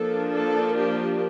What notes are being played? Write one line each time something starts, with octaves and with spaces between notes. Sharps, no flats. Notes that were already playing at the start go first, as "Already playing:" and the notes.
Already playing: F3 A#3 D4 A4
A4
G4